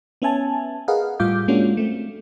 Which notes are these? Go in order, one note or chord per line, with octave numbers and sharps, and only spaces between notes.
B3 C#4 E5 G#5 A5
G#4 A#4 B4 D#5 F5 F#5
A2 G3 F4 F5 D6 G6
G#3 A#3 C#4 D4 F4 F#4
A3 C4